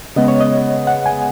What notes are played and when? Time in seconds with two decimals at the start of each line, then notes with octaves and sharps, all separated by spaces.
0.16 C#3 G#3 B3 D#5
0.28 C#5
0.41 D#5
0.87 F#5
1.06 G#5